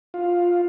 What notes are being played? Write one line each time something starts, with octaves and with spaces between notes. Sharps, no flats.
F4